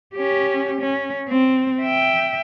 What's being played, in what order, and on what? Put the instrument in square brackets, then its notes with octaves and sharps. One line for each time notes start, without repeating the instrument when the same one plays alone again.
[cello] C#4 G4
C#4
C4
E5 G5